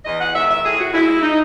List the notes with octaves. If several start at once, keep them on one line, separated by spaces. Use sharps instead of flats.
E2 D#5
F#5
D#3 G#3 E5
E5
A2 G#4
F#4
G#3 E4
E4
D#4